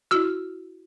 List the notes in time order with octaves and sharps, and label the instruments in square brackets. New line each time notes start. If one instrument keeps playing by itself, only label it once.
[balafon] E4 F#4 [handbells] E6 F6